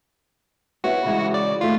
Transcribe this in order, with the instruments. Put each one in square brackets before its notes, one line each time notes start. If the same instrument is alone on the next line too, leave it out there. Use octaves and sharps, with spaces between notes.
[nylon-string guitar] B3 E4 C#5 [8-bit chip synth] F#4
[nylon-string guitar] C#3 E3 G#3
[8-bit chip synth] D5
[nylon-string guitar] D#2 A3 [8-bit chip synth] F4